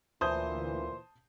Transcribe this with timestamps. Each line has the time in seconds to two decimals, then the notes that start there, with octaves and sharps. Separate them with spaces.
0.21 D2 A#2 E3 C5 A5 D#6 G6